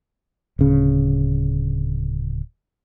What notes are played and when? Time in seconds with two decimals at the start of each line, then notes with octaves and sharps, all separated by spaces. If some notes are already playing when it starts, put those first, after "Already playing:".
0.59 D1 C#3